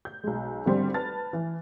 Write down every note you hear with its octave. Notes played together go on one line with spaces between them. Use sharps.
G6
B1 G#3
G#1 D3 G3 C4 C5
B4 A5 F6 A6
E3